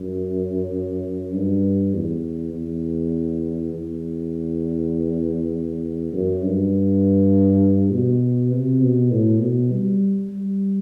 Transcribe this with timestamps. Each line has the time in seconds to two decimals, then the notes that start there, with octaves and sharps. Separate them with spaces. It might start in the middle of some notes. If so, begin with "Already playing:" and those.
Already playing: F#2
1.33 G2
1.94 E2
2.54 E2
3.73 E2
6.13 F#2
6.43 G2
7.92 B2
8.52 C3
8.82 B2
9.11 A2
9.41 B2
9.72 G3
10.31 G3